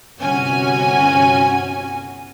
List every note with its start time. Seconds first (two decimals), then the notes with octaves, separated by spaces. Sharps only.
0.20 G1 C3 C#4 F#4 G#5